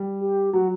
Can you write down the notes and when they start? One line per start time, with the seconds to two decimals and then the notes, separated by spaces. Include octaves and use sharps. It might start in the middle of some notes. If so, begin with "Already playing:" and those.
Already playing: G3
0.21 G4
0.53 F#3 F#4